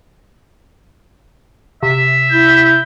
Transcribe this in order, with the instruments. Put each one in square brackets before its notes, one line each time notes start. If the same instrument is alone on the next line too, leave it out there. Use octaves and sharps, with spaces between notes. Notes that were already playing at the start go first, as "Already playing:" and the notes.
[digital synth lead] C3 [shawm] E5
[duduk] E4 [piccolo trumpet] G6